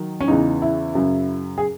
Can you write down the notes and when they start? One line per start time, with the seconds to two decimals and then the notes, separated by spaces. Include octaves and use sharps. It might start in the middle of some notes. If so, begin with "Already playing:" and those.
Already playing: D#3 F#3
0.20 C#4
0.28 E2 C#3 E3 D#4
0.62 E4
0.95 F#2 C#3 F#3
1.58 G#4